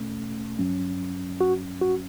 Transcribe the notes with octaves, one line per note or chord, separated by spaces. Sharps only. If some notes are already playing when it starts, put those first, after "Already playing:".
Already playing: E2 B2 A3 C#4
G1 G2 F#3 C#4
F#4
F#4